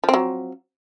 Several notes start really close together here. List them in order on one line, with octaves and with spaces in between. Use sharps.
F3 C4 F#3